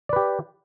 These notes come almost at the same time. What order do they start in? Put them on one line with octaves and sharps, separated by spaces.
D5 B4 G4